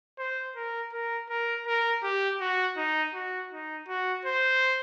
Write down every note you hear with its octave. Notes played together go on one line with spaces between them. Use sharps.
C5
A#4
A#4
A#4
A#4
G4
F#4
D#4
F#4
D#4
F#4
C5